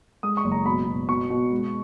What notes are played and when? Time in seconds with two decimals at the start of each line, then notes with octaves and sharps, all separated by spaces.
0.23 G#3 D#6
0.37 C#6
0.44 F#1
0.52 A#5
0.66 B2 B5
0.87 B2
1.09 B2 C#6
1.30 B2
1.52 G#3